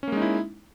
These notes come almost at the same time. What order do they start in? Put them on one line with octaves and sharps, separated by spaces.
C#4 A#3 G#3 D#4 E4